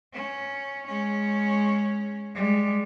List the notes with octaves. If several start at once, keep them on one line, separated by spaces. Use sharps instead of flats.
C#4
G#3 C#4
G3 G#3